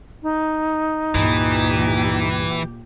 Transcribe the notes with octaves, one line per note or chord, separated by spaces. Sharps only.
D#4
C#2 G2 A#2 E3 G4